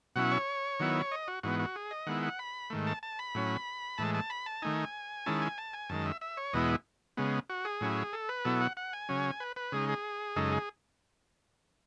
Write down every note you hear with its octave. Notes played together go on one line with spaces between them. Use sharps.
B2 F#3 C#4 E4 F#5
C#5
D#3 F#3 B3 E4
D#5
F#4
G#2 E3 B3 F#4
F#4
G#4
D#5
D#3 G#3 B3 E4 F#5
F#5
B5
G#2 D#3 A3
A5
A5
B5
A2 F#3 C#4
A2 E3 G#3 A5
A5
B5
A5
D#3 A3 D#4 G#5
D#3 G#3 C#4 E4 A5
G#5
A5
G#5
F#2 D#3 G#3 A5
E5
E5
C#5
E2 B2 G#3 B3 E4 D#5
C#3 G#3 B3
F#4
G#4
A2 F#3 C#4 E4
A4
B4
B2 F#3 B3 E4 A4
F#5
F#5
G#5
C#3 F#3 C#4
B4
B4
C#3 G#3 D#4 G#4
G#4
F#2 C#3 G#3 D#4 A4
G#4